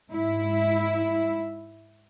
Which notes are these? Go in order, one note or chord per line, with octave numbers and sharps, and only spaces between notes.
G#2 E4